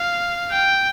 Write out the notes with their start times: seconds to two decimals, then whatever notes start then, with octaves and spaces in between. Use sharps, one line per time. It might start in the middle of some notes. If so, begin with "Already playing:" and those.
Already playing: F5
0.52 G5